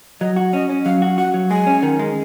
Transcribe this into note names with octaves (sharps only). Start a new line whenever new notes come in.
F#3 D#5
F#4
C#4 D#5
C#4
F#3 F5
F#4
F#4 F#5
F#3
G#3 G#5
C#4
D#3
G#3